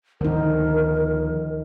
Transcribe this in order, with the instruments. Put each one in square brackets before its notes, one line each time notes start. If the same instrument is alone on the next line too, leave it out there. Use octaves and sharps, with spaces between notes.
[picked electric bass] D2 D3 F3 [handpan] D#3 D#4 [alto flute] A#4